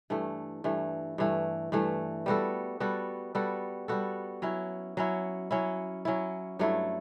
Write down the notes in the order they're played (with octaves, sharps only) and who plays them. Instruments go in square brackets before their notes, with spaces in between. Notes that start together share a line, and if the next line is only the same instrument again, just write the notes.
[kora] G2 E3 A3
G2 E3 A3
G2 E3 A3
G2 E3 A3
G3 B3 F#4 A4
G3 B3 F#4 A4
G3 B3 F#4 A4
G3 B3 F#4 A4
F#3 C#4 E4
F#3 C#4 E4
F#3 C#4 E4
F#3 C#4 E4
G2 F#3 A3 E4